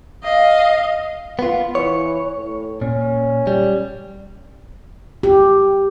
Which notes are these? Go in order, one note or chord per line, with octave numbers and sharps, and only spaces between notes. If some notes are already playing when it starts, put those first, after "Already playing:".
D#5 F5
B3 F4
E3 C#5
A2
A#2 C#4
G3
G4